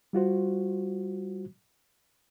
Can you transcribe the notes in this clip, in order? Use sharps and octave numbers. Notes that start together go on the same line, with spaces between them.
G3 F4 F#4 C5